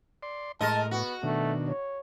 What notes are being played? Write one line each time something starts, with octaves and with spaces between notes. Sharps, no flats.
D5 C6
A2 G#3 A#4 D#5 A5
B3 F#4
B2 D#3 A3 D4
C#5